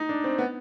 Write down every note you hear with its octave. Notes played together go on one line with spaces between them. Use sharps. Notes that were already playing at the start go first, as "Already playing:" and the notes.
Already playing: D#4
D4
C4
B3